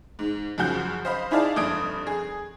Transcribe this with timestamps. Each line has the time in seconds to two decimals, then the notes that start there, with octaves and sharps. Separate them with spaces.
0.19 G#2
0.58 F#2 C#3 F3 F#4 G6
1.05 C5 D#5 F5 B5
1.31 D#4 E4 G#4 D5 F5 A5
1.56 F1 G2 D#6 G#6 D7
2.07 G#4